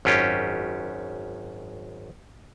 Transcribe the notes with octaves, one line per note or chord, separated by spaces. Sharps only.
G#1 F#2 C#4 F4 G4